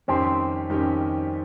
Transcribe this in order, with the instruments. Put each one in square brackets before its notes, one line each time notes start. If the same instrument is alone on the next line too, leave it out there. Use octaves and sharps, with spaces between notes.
[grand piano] F2 D#3 G3 C#4 G4 [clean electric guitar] C4
[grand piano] F2 D#3 G3 C#4 G4